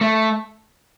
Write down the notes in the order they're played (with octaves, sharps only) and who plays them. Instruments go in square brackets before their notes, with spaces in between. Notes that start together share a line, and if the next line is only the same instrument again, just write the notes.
[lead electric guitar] A3